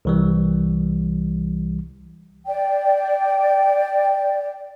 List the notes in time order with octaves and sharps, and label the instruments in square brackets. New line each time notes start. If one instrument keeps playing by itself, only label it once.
[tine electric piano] C2 E3 G3
[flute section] D5 G5